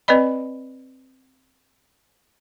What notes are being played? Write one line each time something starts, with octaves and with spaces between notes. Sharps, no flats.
C4 B4 D5 D#5 B5